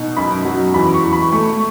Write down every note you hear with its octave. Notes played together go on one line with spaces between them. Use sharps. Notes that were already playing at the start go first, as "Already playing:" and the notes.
Already playing: B2 D#4
F#2 B5
F#3
E2 B5
C#6
E2
B5
A3 C#6